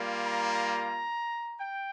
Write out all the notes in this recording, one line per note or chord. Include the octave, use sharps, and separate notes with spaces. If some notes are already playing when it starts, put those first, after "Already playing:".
Already playing: G3 A#3 F4
A#5
G5